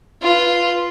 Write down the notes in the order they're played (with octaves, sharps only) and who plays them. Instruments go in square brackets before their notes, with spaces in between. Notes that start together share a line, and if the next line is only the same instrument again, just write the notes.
[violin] F4 B4